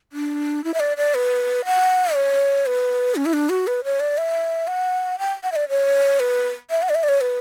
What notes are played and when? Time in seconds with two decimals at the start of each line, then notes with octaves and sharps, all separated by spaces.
0.12 D4
0.64 E4
0.74 E5
0.80 D5
0.97 D5
1.14 B4
1.65 F#5
2.14 C#5
2.66 B4
3.16 C#4
3.26 E4
3.33 D4
3.49 F#4
3.67 B4
3.84 C#5
4.00 D5
4.18 E5
4.67 F#5
5.19 G5
5.43 F#5
5.52 E5
5.56 D5
5.69 C#5
6.20 B4
6.70 E5
6.82 F#5
6.89 D5
6.95 E5
7.03 D5
7.09 C#5
7.21 B4